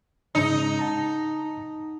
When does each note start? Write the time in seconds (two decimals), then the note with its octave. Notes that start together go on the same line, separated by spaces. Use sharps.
0.35 G#2 C#3 D#4
0.79 F#5 A5 A#5